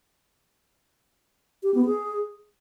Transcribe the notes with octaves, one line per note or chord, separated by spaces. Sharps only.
G4
B3
G#4